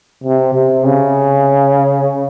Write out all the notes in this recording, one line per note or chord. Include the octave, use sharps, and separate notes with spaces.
C3
C3
C#3